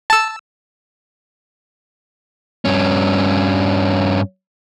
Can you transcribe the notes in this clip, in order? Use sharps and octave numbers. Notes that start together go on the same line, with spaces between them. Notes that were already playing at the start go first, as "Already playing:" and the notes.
A5 E6
G2 C#4